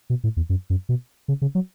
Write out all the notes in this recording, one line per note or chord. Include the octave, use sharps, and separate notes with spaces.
B2
A2
E2
F#2
F#2
B2
C#3
C#3
F#3